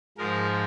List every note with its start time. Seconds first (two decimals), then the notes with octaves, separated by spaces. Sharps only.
0.18 G#2 F3 G#3 A#4